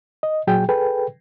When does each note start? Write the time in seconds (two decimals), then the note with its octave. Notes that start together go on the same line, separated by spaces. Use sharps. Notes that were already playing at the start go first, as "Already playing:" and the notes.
0.23 D#5
0.47 A#2 F#3 G#4 G5
0.69 G#4 A4 B4 G5